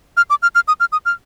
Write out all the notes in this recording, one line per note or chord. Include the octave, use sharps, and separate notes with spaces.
F6
D6
F6
F6
D#6
F6
D#6
F6